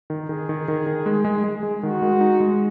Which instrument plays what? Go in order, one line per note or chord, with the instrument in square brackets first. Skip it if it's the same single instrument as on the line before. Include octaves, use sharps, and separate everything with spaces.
[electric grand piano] D#3
[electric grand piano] D#3 [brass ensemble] G#4
[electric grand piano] D#3
D#3
D#3
G#3
G#3
G#3
G#3
[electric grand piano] D#3 [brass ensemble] F#4
[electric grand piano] G#3
D#4
G#3